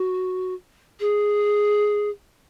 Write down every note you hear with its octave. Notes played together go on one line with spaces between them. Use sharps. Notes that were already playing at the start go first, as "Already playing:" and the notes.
Already playing: F#4
G#4